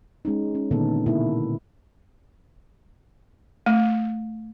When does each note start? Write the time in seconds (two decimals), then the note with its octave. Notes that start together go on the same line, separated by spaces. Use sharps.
0.25 G#3 C#4 D#4
0.55 C#4
0.71 A#2 D3 D#3 B3 D#4 A4
1.06 B2 A#3 E4
3.66 A3